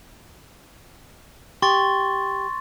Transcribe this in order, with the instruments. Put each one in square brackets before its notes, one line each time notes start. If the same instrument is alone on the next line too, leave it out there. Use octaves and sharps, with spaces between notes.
[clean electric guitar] G4 [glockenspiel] C6 C#6 A6